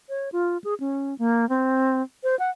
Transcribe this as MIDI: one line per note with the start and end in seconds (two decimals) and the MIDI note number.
0.09 0.29 73
0.32 0.58 65
0.64 0.74 68
0.80 1.17 61
1.19 1.48 58
1.49 2.02 60
2.24 2.38 72
2.39 2.50 78